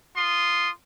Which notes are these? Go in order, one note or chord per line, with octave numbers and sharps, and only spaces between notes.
F4 C6 D#6